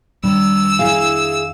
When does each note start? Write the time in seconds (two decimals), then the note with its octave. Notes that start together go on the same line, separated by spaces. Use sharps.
0.24 F2 D#3 G3 D4 E6
0.79 E4 G#4 F5